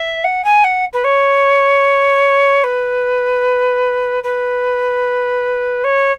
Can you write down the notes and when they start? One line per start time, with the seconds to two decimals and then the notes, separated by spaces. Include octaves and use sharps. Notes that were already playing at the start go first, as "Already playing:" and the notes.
Already playing: E5
0.24 F#5
0.45 G#5
0.64 F#5
0.93 B4
1.04 C#5
2.64 B4
4.24 B4
5.84 C#5